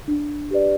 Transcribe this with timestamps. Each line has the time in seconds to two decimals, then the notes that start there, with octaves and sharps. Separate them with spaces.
0.08 D4
0.51 G4 B4 D5